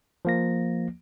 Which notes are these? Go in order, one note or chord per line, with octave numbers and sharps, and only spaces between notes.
F3 A#3 A#6